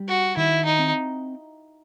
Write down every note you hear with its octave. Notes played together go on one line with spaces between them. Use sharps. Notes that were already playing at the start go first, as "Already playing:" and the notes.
Already playing: G3
F#4
D#3 E4
D#4
C4